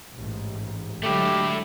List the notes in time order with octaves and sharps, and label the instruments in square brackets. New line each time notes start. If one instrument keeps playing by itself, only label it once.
[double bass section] A1 G#2
[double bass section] D3 F#3 G#3 [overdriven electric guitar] A3 E4 [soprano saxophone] G4